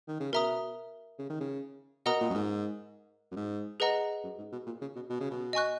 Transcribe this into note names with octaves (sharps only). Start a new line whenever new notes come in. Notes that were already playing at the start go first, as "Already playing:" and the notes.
D#3
C#3
B2 A#4 E5 A#5 D#6
C#3
D#3
C#3
B2 A#4 D#5 F#5 A#5 D#6
A#2
F#2
G#2
F#2
G#2
G#4 B4 D#5 F#5 A#5
F#2
G#2
B2
A#2
C#3
B2
B2
C#3
B2
D#5 G#5 C#6 F#6